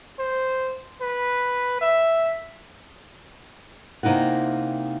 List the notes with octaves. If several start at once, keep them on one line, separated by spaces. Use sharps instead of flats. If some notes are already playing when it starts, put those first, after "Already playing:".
C5
B4
E5
C3 A#3 D#4 E4 F#5